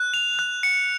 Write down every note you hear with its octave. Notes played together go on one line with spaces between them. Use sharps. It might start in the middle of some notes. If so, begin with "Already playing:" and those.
Already playing: F#6
F7
F#6
C#7